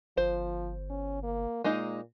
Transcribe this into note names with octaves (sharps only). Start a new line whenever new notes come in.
G1 F3 C5
C#4
A#3
A#2 G#3 A#3 D#4